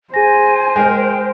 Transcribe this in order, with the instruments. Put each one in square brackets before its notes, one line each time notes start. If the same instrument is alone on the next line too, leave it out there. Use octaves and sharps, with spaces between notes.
[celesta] G#4 A#6 [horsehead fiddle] C5 [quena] G#5
[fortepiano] G#3 A#4 [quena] G5 [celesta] G#5